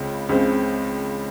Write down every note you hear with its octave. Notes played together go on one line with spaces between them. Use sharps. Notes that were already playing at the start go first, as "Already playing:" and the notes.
Already playing: C#2 C#3 C4
C#2 C#3 G#3 C4